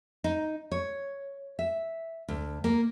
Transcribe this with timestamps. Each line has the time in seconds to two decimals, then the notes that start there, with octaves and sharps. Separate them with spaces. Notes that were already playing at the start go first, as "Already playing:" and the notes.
0.24 D#4
0.71 C#5
1.59 E5
2.28 D2
2.64 A#3